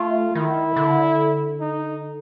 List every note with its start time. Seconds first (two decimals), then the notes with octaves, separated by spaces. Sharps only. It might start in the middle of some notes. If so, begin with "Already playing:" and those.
Already playing: A3 F4
0.35 D#3 E4
0.76 D3
1.60 D#4